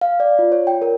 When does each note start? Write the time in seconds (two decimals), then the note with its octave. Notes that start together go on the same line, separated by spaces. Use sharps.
0.01 F5
0.20 D5
0.39 F4
0.52 C#5
0.67 G5
0.82 A#4